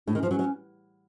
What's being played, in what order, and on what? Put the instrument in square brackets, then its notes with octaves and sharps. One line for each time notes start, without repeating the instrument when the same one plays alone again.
[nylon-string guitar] A2 [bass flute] D4
[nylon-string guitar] D#3 [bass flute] C#4
[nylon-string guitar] F3
[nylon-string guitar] F#3 [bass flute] C#4
[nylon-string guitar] F#3